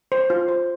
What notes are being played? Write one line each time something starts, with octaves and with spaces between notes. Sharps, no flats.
C5
F4
C5